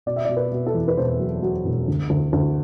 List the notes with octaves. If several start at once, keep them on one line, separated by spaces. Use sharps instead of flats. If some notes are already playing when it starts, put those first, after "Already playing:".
B2 D5
E5
D5
B2
B4
B2
A4
E2
B4
E1 C5
F#3
F#3
E1
D2
D2
D2